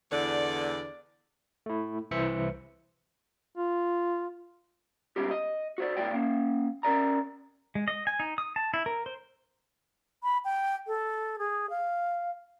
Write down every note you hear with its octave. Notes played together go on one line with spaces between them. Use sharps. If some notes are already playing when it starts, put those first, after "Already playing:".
E2 D3 D5
A3 E4
C2 E3 C5 E5 C#7
F4
G#2 B2 G3 C#4 D#4 G4
D#5
F#4 C5 D5
C#2 A2 C#5 D5 G5
A#3 C#4
C#4 A#4 D5 A#5
G#3
D#5
G#5
D#4
D#6
A5
E4
A#4
C5
B5
G5
A4
G#4
F5